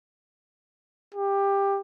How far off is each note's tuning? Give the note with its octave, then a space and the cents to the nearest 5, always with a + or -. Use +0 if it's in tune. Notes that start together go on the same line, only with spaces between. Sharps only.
G4 +15